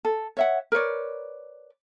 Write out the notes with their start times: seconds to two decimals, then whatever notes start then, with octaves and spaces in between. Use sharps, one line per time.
0.05 A4
0.37 C#5 E5 F#5
0.72 A#4 B4 C#5 D5